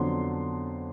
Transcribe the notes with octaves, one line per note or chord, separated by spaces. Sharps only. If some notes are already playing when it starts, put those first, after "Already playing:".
Already playing: F2 D3 F#3 B3 D4 C6